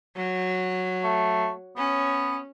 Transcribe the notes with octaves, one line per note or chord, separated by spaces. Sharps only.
F#3
A3
B3 C#4